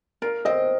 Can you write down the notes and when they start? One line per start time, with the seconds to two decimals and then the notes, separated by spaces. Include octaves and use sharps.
0.22 F4 A#4
0.45 C4 D#5